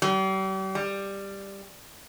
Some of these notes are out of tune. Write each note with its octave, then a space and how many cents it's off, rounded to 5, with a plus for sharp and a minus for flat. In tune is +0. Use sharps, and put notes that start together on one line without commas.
G3 -40
G3 +10